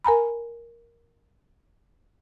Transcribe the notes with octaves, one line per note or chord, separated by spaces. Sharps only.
A#4 G#5 A#5 B5